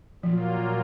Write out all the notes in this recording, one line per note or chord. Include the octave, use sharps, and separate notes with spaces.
A#2 F3 F#3 A#3 F4